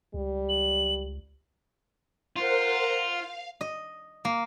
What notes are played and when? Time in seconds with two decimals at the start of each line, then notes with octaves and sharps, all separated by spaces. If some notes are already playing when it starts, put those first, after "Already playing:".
0.14 C#2 G3
0.49 F#7
2.36 F4 A#4 C5 F#5
3.03 F5
3.61 D#5
4.25 A#3